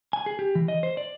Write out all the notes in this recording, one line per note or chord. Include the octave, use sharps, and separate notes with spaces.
G#5
G#4
G4
E3
D#5
C5
D5